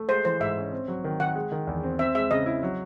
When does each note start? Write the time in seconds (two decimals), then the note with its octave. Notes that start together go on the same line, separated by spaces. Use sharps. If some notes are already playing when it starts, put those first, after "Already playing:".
Already playing: A3
0.09 G#3 C5
0.25 E3 C5
0.40 G#2 E5
0.57 C#4
0.73 C4
0.88 F#3
1.04 D#3
1.20 D#3 F#5
1.35 G#3
1.52 D#3
1.67 E2
1.83 C4
1.99 C4 E5
2.15 G#3 E5
2.31 C#3 D#5
2.46 E4
2.63 F#3